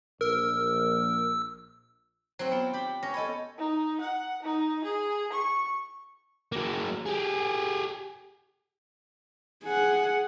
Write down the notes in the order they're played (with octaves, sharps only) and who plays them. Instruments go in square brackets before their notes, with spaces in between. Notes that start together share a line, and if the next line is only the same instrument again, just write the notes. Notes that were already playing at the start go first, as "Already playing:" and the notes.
[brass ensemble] A#1 [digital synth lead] A#4 [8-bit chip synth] E6
[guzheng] F#3 C4 [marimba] C5
[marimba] B3 [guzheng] F4
[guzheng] G4 B5
[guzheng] C#4 [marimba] A#6
[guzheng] A4 C#5 [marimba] D#5 B5
[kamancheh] D#4
F#5
D#4
G#4
C#6
[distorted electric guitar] F#3 A#3
G4 G#4
[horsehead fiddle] G#4 F#5